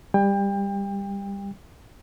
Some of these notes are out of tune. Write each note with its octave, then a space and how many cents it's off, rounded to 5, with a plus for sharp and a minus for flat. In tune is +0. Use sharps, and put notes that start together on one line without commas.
G3 +20 G5 +30